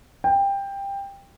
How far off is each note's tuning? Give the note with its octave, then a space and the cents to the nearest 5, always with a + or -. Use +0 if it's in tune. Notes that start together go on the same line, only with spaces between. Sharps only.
G5 +15